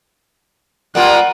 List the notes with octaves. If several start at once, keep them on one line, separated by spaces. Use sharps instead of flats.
G3 A#3 F4 F#5